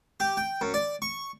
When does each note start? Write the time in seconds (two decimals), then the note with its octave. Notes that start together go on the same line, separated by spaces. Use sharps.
0.20 G4
0.37 G5
0.61 F#2
0.74 D5
1.02 C#6